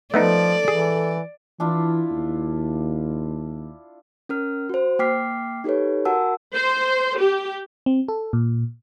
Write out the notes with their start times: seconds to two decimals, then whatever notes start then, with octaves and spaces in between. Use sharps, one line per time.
0.14 F3 A3 B3 D#4 A4 D5
0.68 E3 G#4
1.60 E3 D4 E4 F4
2.11 D#2
4.29 C#4 A#4 F6
4.69 F#4 C5
4.99 A#3 G5 D6 F6 B6 C7
5.64 D#4 G4 A4 B4 C#5
6.05 F#4 A#4 F#5 G#5 A5 E6
6.55 C5
7.20 G4
7.86 C4
8.08 A4
8.33 A#2